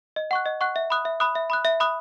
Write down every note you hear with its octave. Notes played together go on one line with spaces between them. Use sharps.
D#5
F#5 C#6 F#6
D#5
F#5 C#6 F#6
E5
B5 D#6 F#6
E5
B5 D#6 F#6
E5
B5 D#6 F#6
E5
B5 D#6 F#6